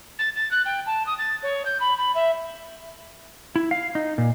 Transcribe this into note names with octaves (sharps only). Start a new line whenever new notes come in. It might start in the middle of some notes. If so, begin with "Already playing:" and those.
A6
A6
F#6
G5
A5
D#6
A6
C#5
G6
B5
B5
E5
E4
F5
D#4
A#2